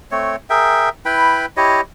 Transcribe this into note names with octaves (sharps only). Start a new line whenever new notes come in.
A3 C4 C#5
G#4 A#4 E5 G5
E4 B4 G5 B5
E4 G4 C#5 D#5